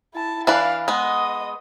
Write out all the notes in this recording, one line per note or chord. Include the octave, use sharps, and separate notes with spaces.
E4 A5
E3 D4 B4 F5
G#3 B3 D#5 D#6